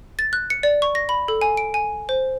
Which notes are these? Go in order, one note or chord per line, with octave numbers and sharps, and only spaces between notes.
A6
F#6
C#7
D5
C#6
A#6
B5
A4
G#5
D7
G#5
C5